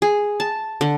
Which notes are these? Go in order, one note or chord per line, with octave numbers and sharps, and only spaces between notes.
G#4
A5
D3